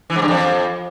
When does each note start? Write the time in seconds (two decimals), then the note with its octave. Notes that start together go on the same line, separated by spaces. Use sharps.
0.10 E3
0.16 G#2
0.22 G2
0.28 F2